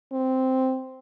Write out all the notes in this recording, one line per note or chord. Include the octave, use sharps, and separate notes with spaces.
C4